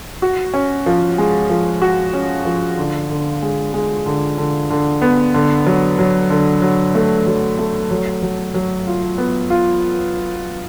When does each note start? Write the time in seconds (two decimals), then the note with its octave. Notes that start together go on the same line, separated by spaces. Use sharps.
0.22 F#4
0.54 C#4
0.86 F3
1.18 G#3
1.50 F3
1.82 F#4
2.13 C#4
2.45 F3
2.77 D3
3.10 D3
3.42 G#3
3.74 G#3
4.06 D3
4.38 D3
4.70 D3
5.02 B3
5.34 D3
5.66 F#3
5.99 F#3
6.30 D3
6.62 F#3
6.95 A3
7.27 F#3
7.59 A3
7.91 F#3
8.23 F#3
8.54 F#3
8.87 F4
9.18 B3
9.50 F4